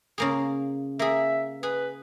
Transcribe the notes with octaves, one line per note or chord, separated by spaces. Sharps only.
C#3 A#3 G#4
A#3 G#4 E5
G#4 B4